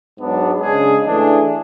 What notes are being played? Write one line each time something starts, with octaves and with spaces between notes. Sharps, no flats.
G#2 F#3 B3 D4
C#3 G#3 D4 G#4
E3 A3 D4 G#4